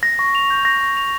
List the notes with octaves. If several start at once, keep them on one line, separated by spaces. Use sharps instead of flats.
A#6
C#6
F7
G6
A#6
C#6
F7